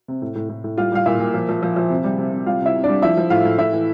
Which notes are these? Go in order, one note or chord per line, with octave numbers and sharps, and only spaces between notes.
C3
A2
A2
A2
A2
G3 F4 F5
G3 F5
A#2 E4 E5
A#2
F3
F3
F3
F3
C3
G3
C3
C3
G3 F4 F5
C3
E4 E5
C3
G3 D4 D5
F3 E4 E5
F3
A2 F4 F5
A2
A2 E4 E5
E3